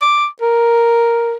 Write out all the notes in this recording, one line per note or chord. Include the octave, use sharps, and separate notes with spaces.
D6
A#4